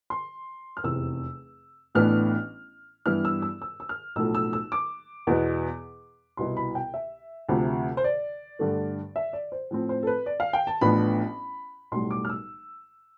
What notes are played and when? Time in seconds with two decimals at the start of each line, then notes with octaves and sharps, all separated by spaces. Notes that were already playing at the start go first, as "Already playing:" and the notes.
0.10 C6
0.77 F6
0.84 F1 E2 C3 E6
1.95 A1 A2 E3 B3 D4 F6
3.06 G2 E3 G3 B3 E4 F6
3.25 E6
3.42 E6
3.62 E6
3.80 E6
3.89 F6
4.16 B1 A2 F3 A3 E6
4.35 E6
4.53 E6
4.72 D6
5.27 E2 B2 B3
6.37 C2 B2 B3 E4 C6
6.57 B5
6.75 G5
6.94 E5
7.49 D2 C3 F3
7.97 C5
8.04 D5
8.59 G2 D3 A3
9.16 E5
9.33 D5
9.52 C5
9.71 A2 F3 C4
9.89 C5
10.03 A4
10.07 B4
10.26 D5
10.40 F5
10.53 G5
10.67 A5
10.81 A1 A2 F3 B3 D4 B5
11.92 B1 A2 G3 C6
12.11 D6
12.25 F6
12.29 E6